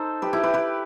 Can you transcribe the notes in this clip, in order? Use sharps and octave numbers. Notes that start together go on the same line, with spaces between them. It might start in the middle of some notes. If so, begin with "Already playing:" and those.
Already playing: D#4 A4 C5
G4 B4
E4 G4
G4 B4
G4 B4